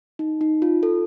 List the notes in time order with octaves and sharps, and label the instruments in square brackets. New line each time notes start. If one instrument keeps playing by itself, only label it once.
[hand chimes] D#4
D#4
F4
A4